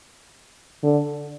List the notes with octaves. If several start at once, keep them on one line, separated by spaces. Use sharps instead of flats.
D3